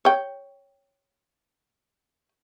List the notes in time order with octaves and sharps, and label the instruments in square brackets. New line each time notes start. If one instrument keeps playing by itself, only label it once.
[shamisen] C#5 G5